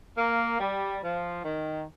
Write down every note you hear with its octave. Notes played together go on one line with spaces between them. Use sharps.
A#3
G3
F3
D#3